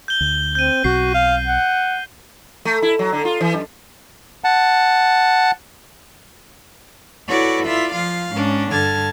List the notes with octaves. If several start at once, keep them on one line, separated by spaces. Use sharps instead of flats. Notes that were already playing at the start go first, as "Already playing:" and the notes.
G6 G7
D2
C4 G6 D#7
B1 B2 C4 F#4 C7
F5
F#5
A3
E4
F#3
D3
F4
E3
F#2
F#5 A5
E4 F#4 A4 B4 C#5 D5
E4 F4 D5 E5
F3 F4 F5
G#2 C#4 D4
G2 D3 A5 F6 G#6